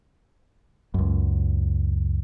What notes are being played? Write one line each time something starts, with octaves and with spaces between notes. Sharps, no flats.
C#2 F#2